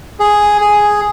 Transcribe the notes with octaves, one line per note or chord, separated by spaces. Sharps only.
G#4
G#4